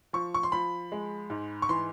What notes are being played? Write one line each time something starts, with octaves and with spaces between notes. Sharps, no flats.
F3 C#6
C#6
C6
F3 B5
G#3
G#2
C#6
E3 C6